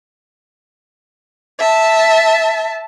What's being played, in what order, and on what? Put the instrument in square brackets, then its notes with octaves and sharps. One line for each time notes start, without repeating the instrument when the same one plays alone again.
[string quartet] E5 A5